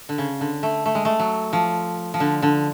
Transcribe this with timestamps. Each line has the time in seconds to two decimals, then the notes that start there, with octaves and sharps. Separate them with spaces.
0.09 D3
0.18 C#3
0.41 D3
0.63 A3
0.86 A3
0.95 G#3
1.05 A3
1.19 F#3
1.53 F3
2.14 F3
2.20 D3
2.42 D3